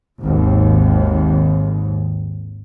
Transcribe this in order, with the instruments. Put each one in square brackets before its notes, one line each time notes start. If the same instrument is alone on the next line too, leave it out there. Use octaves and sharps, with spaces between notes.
[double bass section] G#1 D#2